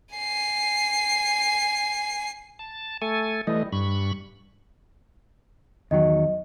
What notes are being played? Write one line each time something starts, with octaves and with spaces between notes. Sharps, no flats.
G#5 C7
A5
A3 A4 G#5
E3 G3 A3 D#5
G2 B5 C#6
E2 D#3 F#3 D#5